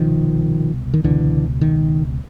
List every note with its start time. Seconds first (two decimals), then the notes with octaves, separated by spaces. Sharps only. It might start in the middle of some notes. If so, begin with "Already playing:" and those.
Already playing: C2 B2 D#3 F3
0.94 D#3
1.04 C#2 B2 D3 E3
1.61 D#3